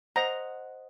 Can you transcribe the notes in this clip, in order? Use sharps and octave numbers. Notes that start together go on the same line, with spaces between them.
C5 D#5 F#5 A#5